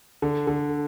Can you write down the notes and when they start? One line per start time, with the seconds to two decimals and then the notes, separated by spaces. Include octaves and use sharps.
0.22 D3
0.47 D3